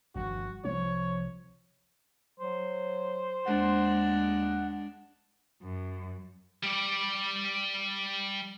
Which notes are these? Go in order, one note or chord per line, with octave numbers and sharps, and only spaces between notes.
G1 G2 D#3 F3 F#4
C2 F3 C#5
F#3 C5
D#2 G#3 D4 F#5
F#2
G3 D5